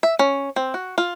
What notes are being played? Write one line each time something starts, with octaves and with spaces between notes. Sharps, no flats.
E5
C#4
C4
F#4
F4